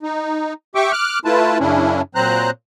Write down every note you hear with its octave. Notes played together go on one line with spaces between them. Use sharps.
D#4
G4 E5 G5 C#6 D6
D6 F6 F#6
A3 E4 F4 B4 A5
F#2 C#3 C#4 D4 E4
A#2 F#3 C4 C5 A#5 F#6